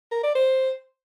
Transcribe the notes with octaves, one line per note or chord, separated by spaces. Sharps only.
A#4
D5
C5